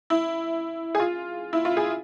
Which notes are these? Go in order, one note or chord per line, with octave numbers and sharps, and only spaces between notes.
E4
G#4
F4
E4
F4
G#4